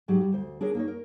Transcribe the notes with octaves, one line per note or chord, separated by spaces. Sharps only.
G#2 F#3 G4
G3
D2 C5
D4 G#4 A#4 C#5
A#3 D#4 C#5
A#4